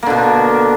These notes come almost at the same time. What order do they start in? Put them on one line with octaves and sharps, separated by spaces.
A#3 D3 B2